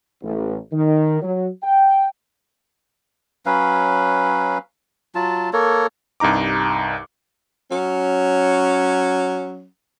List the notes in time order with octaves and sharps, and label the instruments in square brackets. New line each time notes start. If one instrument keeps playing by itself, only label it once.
[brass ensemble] A1
D#3
F#3
G5
[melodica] F#3 C#4 B4 F5
F#3 F4 A5
A#3 A4 A#4 C#5
[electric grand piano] C2 G2 D#4 A#5 D6
[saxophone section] F#3 C#4